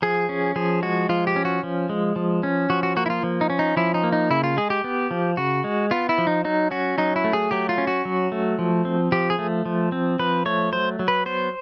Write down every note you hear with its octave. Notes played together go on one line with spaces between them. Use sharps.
F3 G#4
C#4
F3 G#4
G#3 F#4
F3 F4
G4
C#4
F#4
F3
G#3
F3
C#4
F3 F#4
F#4
A#3 F#4
E4
F4
F3
D#4
C#4
D#4
F3 E4
D#4
A#3
D#4
C#3 E4
F4
G#3 G#4
G4
B3
F3
C#3 F#4
G#3
B3 F4
E4
F3
D#4
F#3 D#4
C#4 F#4
F#3 D#4
E4
A3
G#4
F#3 G4
F4
C#4
F#4
F#3
A3
F3
C4
F3 G4
G#4
A3
F3
C4
F3 B4
A3 C#5
F#3 C5
F#3
B4
B3 C5